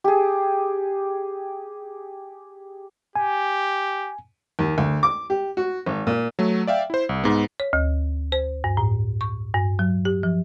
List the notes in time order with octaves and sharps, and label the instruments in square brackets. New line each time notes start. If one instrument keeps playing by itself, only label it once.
[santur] G4 G#4
[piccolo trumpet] G4 [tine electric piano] G#5
[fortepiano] D#2
D2
D6
G4
F#4
G#1
A#2
[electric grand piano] F#3 A3
D5 E5 F5 G5
E4 C5
C2
G#2 B3
[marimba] C#5
D2
C5
G2
A2
C#6
G2
F#3
G4
F3